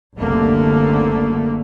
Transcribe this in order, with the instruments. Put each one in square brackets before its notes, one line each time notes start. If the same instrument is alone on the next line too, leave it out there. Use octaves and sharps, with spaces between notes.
[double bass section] F#1 C2 D3 A3 A#3